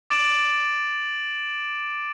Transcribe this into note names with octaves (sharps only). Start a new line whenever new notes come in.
D6 A6 D7 E7 F#7